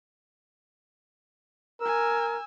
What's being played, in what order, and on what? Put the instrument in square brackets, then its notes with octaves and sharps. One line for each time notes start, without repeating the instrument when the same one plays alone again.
[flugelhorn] A#4 [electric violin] G#5 E6